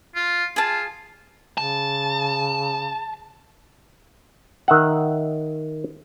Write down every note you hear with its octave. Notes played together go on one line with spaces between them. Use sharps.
F4
F4 G#4 A5
C#3 A5
D#3 E5 F#5